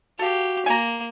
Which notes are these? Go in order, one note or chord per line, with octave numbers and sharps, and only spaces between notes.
F#4 G4 A4 F5
A#3 G#5 A#5